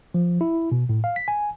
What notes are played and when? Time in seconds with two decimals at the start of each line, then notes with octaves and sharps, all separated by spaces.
0.14 F3
0.41 E4
0.72 B2
0.89 A2
1.04 F5
1.16 B6
1.28 G#5